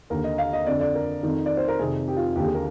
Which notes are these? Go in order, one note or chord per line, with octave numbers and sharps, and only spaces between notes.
D#2 D3 A#4
D#5
F5
D#5
F2 D3 D5
D5
A#4
F2 D#3
D5
C5
A#4
F2 C3 D#3 G#4
G4
F4
D#2 D3 G4
G#4
A#4